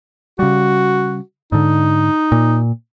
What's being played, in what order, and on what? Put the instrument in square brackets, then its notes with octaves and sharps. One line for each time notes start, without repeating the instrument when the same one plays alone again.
[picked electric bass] C#3 G3 [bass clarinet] F#4
[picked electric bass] G#2 D3 [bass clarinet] D#4
[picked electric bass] A#2